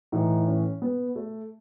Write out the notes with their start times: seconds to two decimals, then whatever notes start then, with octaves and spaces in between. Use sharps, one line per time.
0.12 A2 E3 D#4
0.47 C#4
0.82 B3
1.16 A3